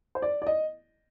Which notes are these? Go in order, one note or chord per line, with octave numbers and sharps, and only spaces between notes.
C5
D5
D5
D#5